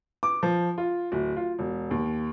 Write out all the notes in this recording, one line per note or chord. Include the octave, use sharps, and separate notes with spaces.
D6
F3
F4
D1
F4
E1
D#2